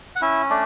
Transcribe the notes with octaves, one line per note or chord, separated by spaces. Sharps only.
F#5
C#4 E4 E5
A3 D4 D5